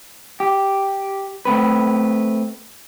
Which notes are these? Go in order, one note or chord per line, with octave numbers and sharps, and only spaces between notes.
G4
A3 C4 B4